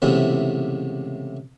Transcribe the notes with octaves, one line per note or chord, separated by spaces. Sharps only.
C#2 A2 C3 E3 B3